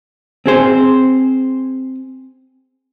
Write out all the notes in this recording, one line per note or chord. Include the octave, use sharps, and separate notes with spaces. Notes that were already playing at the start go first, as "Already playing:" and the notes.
C4 G#4 C5